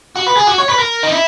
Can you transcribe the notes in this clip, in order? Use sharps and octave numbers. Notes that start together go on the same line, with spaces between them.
F#4
B4
G#4
F#4
C#5
B4
A#4
D#4
E4